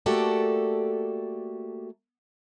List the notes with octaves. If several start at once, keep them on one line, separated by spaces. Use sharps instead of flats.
A3 A#3 F#4 G4 A4 D5